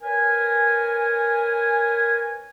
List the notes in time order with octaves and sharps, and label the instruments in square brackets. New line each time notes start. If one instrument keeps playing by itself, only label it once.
[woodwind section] A#4 B4 C#5 G#5